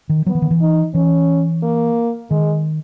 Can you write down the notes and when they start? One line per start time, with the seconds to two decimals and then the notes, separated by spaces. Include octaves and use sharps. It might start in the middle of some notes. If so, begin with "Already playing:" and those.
0.09 D#3
0.26 F#3 B3
0.35 E3
0.42 D#3
0.51 E3
0.61 D#4
0.94 E3 C#4
1.63 A#3
2.30 D#3 G#3